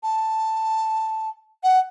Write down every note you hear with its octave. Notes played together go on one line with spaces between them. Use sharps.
A5
F#5